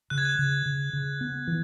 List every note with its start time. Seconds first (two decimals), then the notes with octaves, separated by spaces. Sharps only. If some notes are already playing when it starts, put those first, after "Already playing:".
0.10 C#3 F#6
0.18 G#6
0.25 F#6
0.39 C#3
0.66 C#3
0.93 C#3
1.21 B3
1.47 E3